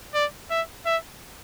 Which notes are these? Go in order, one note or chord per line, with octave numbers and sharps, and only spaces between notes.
D5
E5
E5